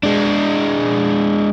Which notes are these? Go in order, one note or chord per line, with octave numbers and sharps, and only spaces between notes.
G#3 D4